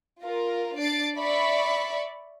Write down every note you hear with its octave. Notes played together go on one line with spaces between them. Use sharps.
F4 A#4
D4 D5 A6 C7 D7
D5 E5 B5 C#6